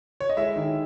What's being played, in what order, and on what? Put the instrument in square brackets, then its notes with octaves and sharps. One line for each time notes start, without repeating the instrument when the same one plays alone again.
[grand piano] C#5
D#5
G#3 E4 E5
D#3